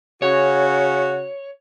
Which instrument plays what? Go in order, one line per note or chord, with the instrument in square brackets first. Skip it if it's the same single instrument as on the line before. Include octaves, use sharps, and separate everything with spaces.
[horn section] C#3 C#4 F#4 [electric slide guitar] C#5